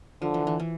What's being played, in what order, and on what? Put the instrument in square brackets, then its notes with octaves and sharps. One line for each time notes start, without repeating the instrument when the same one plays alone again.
[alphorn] D3 [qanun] F3
[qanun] E3
E3
E3